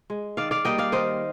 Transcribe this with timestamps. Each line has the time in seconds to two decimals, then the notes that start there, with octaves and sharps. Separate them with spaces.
0.10 G#3
0.37 D#3 D5 F5
0.51 D5 F5
0.65 G3 A#3 D#5 G5
0.78 D5 F5
0.92 D#3 C5 D#5